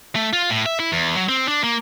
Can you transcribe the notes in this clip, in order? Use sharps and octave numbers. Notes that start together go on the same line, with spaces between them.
A3
F4
A2
E5
E4
E2
F#3
C4
D4
A#3